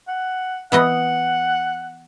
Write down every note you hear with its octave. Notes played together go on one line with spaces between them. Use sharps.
F#5
E3 B3 D#5 F#5